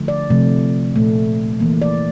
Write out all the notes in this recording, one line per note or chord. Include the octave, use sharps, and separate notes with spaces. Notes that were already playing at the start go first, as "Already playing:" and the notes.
Already playing: D3 F3 A3
D5
C3 F3 A3
A#2 A3
E3 A#3
D5